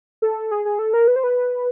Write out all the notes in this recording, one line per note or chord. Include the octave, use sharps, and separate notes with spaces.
A4
G#4
G#4
A4
A#4
B4
C5
B4